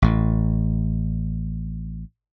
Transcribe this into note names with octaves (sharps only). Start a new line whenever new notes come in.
A1 A2